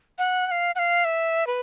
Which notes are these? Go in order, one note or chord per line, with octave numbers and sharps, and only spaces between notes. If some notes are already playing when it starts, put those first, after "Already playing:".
F#5
F#5
F5
F#5
F5
E5
B4